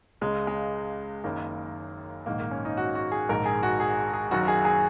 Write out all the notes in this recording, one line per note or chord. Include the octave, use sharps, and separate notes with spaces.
C#2 C#3 G#3
G#3
F#1 F#2 D#3 A#3
A#1 G#2 D#3 A#3
A#3
C#4
D#4
F#4
F#4
G#4
A#1 G#2 D#3 A#4
G#4
F#4
G#4
G#4
F#1 F#2 D#3 F#4
G#4
G#4